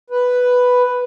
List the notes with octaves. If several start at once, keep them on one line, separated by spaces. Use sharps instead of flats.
B4